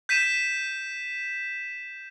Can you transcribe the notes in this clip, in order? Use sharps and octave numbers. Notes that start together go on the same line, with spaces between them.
G6 B6 D#7 E7